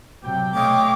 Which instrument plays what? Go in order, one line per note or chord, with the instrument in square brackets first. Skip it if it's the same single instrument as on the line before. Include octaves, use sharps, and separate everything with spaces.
[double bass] C3 F#3 [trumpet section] G4 G5
[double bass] B2 A3 [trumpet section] C#5 D#5 F5 [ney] G5 [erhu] D6